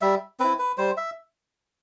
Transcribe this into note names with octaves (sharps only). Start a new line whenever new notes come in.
G3 E5
C4 E4 B4
B4
G3 C5
E5